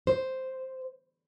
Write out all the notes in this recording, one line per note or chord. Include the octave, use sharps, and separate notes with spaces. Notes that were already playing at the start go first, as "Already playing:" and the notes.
C5